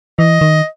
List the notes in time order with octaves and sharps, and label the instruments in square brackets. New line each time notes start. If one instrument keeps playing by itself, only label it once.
[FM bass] E3 [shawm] D#5
[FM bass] D#3